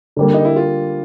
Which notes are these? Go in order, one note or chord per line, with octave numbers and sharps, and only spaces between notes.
D3 G3 A#3
D#4
E4
F4